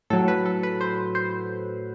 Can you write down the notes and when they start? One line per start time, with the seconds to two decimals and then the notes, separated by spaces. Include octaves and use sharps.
0.10 A2 F#3 A4
0.28 B4
0.46 A4
0.63 B4
0.81 C5
1.15 C5